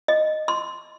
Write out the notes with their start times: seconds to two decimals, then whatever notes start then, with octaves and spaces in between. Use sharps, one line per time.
0.08 D#5
0.48 C6